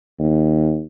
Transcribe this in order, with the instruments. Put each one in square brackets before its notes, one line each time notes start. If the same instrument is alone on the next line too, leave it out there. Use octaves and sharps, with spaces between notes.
[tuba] D#2